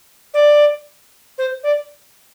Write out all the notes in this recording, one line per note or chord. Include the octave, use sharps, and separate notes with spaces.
D5
C5
D5